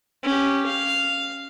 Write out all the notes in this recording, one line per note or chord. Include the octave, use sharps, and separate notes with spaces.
C#4 G4
F5